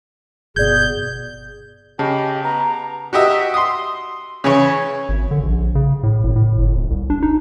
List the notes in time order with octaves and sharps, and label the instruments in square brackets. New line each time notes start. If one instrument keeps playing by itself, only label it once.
[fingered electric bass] G1 B2 [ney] G#4 [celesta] D5 G#6 [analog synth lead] G6
[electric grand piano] C#3 [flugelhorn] G4 [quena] D#5 [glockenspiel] A5
[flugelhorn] B3 [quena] A#5
[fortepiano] F#4 G4 D#5 E5
C6 D#6
C#3 E3 C#5
[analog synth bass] G#1
D3
A#1
C#3
A2
G#1
A2
G1
E1
C2
D4
D#4